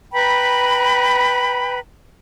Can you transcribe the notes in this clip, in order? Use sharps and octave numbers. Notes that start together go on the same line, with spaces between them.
B4 G5 A#5 B5